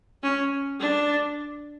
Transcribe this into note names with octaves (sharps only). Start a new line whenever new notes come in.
C#4
D4